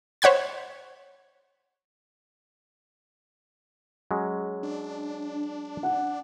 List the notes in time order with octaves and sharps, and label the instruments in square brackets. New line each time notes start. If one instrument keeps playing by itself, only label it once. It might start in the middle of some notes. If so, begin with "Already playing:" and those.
[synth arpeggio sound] C5 C#5 F#5 B5 G#6
[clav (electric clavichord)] F#3 G#3 C#4
[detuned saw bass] D4
[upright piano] F#5